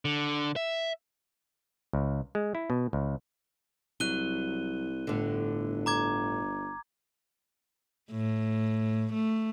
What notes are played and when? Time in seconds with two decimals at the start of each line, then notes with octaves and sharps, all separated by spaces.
0.05 D3
0.56 E5
1.93 C#2
2.35 G#3
2.55 E4
2.70 B2
2.93 C#2
4.00 C2 F#3 F#6 D#7 G7
5.07 G1 A2 D3
5.86 A#5 D6 G#6
8.11 A2
9.13 A3